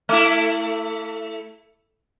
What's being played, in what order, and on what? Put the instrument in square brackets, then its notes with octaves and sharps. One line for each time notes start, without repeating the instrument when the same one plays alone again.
[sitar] A3 E4